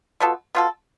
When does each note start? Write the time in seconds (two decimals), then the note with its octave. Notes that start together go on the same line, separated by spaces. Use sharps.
0.20 B2 B3 F4 A4
0.55 B2 B3 F4 A4